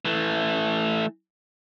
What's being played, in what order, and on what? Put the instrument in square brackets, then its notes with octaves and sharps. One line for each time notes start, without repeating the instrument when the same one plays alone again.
[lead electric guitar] E3 A3